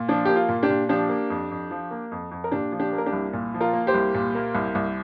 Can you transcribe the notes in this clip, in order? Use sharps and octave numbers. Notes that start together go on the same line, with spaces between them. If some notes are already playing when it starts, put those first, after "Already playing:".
Already playing: A#2
F3 D4
A#3 G4
F4
A#2
D4 G4
A#2
F3 D4 G4
A#3
F2
F2
F3
A#3
F2
F2
A#4
A#2 D4 G4
F3
D4 G4
A#3
A#4
D4 G4
C2
A#2
F3
F4 A#4
A#3
G4 C5
C2
A#2
A#3
C2
C2